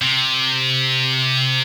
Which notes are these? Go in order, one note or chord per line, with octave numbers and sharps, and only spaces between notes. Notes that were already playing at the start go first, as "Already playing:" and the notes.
C3